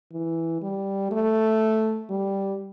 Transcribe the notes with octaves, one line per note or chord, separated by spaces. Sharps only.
E3
G3
A3
G3